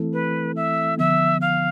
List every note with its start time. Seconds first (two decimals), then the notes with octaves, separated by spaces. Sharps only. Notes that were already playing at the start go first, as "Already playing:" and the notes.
Already playing: E3 A3 C4 E4 A4
0.13 B4
0.56 E5
0.98 D3 F3 B3 E5
1.41 F5